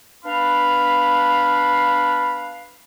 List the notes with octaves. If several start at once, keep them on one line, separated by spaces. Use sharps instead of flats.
B3 D4 F5 B5